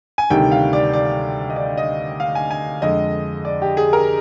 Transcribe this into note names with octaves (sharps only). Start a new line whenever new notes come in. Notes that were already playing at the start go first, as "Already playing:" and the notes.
G#5
D2 C3 D#3 G3 G5
F5
D5
D5
D#5
D5
D#5
F5
G#5
G#5
F2 D3 G#3 D#5
D5
G4
G#4
A#4